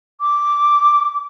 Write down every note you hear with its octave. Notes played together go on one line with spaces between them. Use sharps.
D6